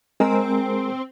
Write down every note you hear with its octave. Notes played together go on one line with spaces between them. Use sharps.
G#3 C4 G#4 A#4